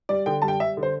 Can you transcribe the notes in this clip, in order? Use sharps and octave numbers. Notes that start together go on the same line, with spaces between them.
G3 D5
D3 G5
G3 A5
G5
G3 E5
D3
C5